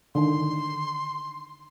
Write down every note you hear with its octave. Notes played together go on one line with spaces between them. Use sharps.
D3 D#3 C6